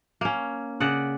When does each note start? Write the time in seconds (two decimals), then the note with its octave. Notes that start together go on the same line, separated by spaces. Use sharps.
0.21 A#3 C#4
0.80 C#3 D5 F#5